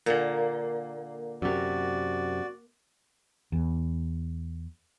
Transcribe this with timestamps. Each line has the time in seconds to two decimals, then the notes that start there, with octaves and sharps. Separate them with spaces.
0.06 A#2 D3 A#3
1.42 F#2 C3 F#4 D5
3.52 E2